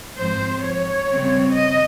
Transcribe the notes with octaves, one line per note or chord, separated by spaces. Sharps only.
G#2 F3 C4 C5
C#5
C#3 G3 C4
D#5